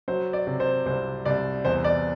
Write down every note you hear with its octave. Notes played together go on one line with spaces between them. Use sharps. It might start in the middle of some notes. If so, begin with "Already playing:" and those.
F#3 C5
D5
C3
C5
C2 C5
C2 D5
E2 C5
D5